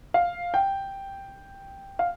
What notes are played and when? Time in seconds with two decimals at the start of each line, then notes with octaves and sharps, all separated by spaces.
0.14 F5
0.54 G5
1.99 F5